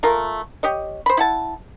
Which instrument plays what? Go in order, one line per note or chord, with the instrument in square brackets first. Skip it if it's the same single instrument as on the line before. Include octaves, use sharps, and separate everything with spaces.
[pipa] A3 F4 A#4
G4 C#5 D#5
C5 B5
E4 F#5 A5